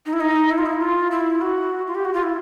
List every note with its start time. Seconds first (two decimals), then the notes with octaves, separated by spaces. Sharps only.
0.06 D#4
0.13 E4
0.20 D#4
0.51 E4
0.58 F4
0.66 E4
0.81 F4
1.11 E4
1.41 F#4
1.87 F4
1.95 G4
2.05 F#4
2.14 F4
2.23 E4